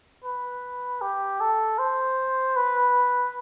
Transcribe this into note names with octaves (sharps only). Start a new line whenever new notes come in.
B4
G4
A4
C5
B4